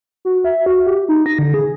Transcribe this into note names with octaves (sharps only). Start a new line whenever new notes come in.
F#4
E5
F#4
G4
D#4
A#6
D3
G#4